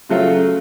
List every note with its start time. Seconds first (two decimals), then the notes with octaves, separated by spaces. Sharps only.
0.09 C#3 F#3 A3 F4